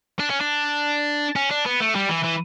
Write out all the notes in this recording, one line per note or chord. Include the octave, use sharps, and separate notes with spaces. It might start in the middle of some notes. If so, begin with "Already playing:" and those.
D4
C#4
D4
C#4
D4
B3
A3
G3
E3
E3